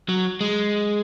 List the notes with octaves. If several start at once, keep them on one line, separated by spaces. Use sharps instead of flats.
F#3
G#3